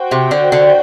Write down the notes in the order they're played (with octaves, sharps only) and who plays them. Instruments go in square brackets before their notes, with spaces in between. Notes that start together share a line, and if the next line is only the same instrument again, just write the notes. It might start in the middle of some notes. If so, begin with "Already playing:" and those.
Already playing: [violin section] F#4 C5 G5
[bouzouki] C3
D3
D3